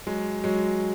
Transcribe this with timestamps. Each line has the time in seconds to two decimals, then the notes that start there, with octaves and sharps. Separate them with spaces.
0.07 F#3 G#3
0.44 F#3 G#3